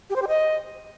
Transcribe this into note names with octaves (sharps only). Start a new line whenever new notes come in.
G4
C5
G4
D#5